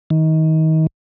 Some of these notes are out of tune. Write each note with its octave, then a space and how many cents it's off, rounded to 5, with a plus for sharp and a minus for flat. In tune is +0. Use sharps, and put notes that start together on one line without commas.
D#3 +30